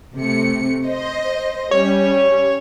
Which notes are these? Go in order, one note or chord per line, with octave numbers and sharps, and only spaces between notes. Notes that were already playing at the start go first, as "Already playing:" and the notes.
C3 A3 C#7
C5 D#5
G3 C#4 C#5